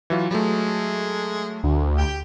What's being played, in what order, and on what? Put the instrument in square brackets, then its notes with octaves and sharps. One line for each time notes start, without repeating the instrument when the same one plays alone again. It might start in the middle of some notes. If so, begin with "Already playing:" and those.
[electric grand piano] E3 F#3 F4
[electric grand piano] F#3 A3 [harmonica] G#3
[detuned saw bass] D2
[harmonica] G4 G5